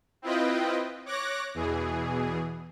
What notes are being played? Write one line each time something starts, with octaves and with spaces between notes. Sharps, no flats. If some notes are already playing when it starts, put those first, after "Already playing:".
C4 E4 F4 B4 D#5 G5
C#5 D6 F#6 A#6
E2 B2 E3 G#4